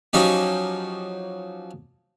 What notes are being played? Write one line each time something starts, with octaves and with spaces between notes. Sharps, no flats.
F3 F#3 C#4 D#4 G4